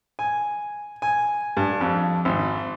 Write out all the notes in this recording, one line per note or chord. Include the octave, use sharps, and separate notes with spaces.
G#5
G#5
G2
F2
G#1